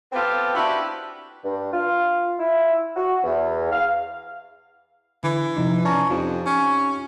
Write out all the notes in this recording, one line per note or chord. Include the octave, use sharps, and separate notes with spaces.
B3 C4 F4 G4 A4
D4 E4 F#4 G4 B4
G2
F4
E4
F#4
E2
F5
D3 E3
C3 F3 D#4
C#4 D5 A5 A#5
F2 D#4 F4 G4
C#4